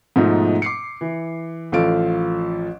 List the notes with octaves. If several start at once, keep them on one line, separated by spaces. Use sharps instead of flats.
G#2 B2 F3 A3 D#4
D6 C7 C#7
E3
A1 F3 A4 F5 D7